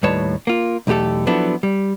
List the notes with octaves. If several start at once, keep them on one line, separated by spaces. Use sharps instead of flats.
D#2 A2 G3 B4 C#5 A5
A#3 F4
B1 E2 A3 G4 A4
F3 F#3 B3 D4 E4 A4
G3